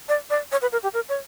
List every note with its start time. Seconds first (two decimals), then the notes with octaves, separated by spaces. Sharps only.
0.09 D5
0.30 D5
0.52 C#5
0.62 B4
0.72 A#4
0.83 G4
0.94 A#4
1.09 C#5